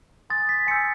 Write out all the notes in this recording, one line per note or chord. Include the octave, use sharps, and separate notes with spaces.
G#5 C6 D#6 A6
B6
G#5 C6 E6 G6 C#7